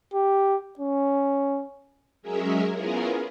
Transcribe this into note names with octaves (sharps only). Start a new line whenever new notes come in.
G4
C#4
F#3 G#3 C#4 G#4 A#4 E5
B3 C#4 E4 F4 G#4 A#4